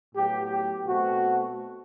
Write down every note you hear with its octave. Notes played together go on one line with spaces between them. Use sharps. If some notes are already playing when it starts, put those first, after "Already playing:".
A2 F#3 B3 G4
G4
B2 A3 C4 F#4